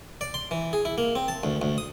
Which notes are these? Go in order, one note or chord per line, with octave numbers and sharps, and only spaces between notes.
D5
C6
E3
G#4
E4
A#3
C4
A5
D2
D2
D#6